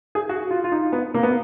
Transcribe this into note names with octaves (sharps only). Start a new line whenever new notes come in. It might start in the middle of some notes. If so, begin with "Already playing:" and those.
G#4
F#4
F4
F4
D#4
B3
A#3
B3